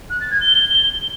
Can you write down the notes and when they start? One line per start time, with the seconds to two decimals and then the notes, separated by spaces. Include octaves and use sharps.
0.10 F#6
0.20 A6
0.31 G#6
0.41 G7